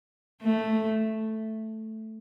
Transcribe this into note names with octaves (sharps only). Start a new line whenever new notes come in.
A3